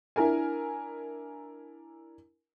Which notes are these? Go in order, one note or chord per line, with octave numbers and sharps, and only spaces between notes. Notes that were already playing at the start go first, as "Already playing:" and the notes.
D4 E4 A#4 G#5